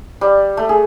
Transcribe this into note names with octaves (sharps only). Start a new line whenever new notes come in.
G3
A3
G#4